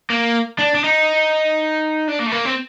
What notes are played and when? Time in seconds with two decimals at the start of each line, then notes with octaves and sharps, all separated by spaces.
0.10 A#3
0.59 D4
0.75 D4
0.84 D#4
2.08 D4
2.20 A#3
2.27 A3
2.32 A#3
2.45 C4